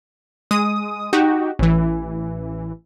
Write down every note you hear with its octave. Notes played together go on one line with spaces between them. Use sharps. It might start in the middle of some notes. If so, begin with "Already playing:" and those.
G#3 D#6
D#4 F#4 G4
A1 E3